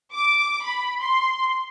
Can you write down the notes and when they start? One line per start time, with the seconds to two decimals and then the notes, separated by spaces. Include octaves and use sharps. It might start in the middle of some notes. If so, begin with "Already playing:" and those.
0.13 D6
0.65 B5
1.01 C6